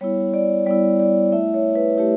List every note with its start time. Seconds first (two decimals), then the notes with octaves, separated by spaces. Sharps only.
0.01 G3 B3 E4 C#5
0.34 D5
0.66 G3 B3 E4 D5
1.00 D5
1.32 A3 E4 E5
1.54 C#5
1.75 B4
1.97 A3 E4 G4